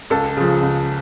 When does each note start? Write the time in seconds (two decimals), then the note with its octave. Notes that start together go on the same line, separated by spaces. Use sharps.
0.10 C#2 A4
0.37 C#3 F3
0.62 C#2